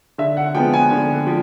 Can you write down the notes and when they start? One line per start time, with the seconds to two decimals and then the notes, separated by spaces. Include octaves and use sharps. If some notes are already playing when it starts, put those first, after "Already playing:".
0.18 D3 E5
0.37 F#5
0.55 F3 G#3 B3 G5
0.73 G#5
0.91 D3
1.27 F3